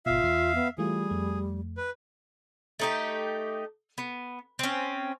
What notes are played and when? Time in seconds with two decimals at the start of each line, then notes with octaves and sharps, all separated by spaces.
0.06 G#1 B2 F4 E5 F5
0.23 E2 C7
0.55 B3
0.78 E3 G3 A3 F4 G#4
1.10 F2 A3
1.77 B4
2.79 A3 D#4 G4
3.98 B3
4.59 C4 C#4